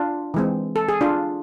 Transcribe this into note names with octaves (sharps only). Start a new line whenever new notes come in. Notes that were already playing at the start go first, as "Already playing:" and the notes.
Already playing: D4 F4
E3 G#3 C4
A4
G#4
D4 F4